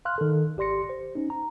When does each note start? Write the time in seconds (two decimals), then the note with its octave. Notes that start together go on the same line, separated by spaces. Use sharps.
0.05 F5 C6 F6 F#6
0.18 D#3 A4
0.57 G#1 G4 D5 C6 A#6 C#7
0.89 C5
1.15 C#4 D#4
1.30 A#5